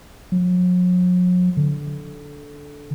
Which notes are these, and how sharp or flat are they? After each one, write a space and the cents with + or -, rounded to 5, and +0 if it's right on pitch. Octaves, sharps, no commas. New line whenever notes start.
F#3 -45
D3 -15